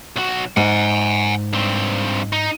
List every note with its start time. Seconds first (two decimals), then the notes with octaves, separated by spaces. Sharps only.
0.16 B1 F#4
0.57 G#2 F#5 G#5
1.53 G2 C4
2.33 D#4